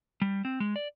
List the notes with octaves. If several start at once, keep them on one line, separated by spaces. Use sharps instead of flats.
G3
C4
G#3
D5